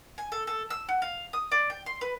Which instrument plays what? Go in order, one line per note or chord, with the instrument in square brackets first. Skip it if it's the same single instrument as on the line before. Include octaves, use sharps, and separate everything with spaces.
[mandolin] G#5
A4
A4
E6
F#4
F5
D#6
D5
G5
C6
B4